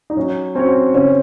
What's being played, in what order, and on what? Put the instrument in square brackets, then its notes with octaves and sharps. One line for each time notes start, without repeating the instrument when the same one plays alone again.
[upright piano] D#4
[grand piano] F#3 [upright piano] C#4
[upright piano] C4 [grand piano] C#4 F#4 C#5
[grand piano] C#3 [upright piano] C#4